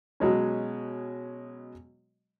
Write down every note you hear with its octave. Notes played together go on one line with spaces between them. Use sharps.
B2 F#3 G#3 C#4